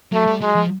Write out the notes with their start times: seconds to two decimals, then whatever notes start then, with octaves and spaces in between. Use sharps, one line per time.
0.13 F#3 A3
0.27 G3
0.41 F#3 G#3
0.55 F3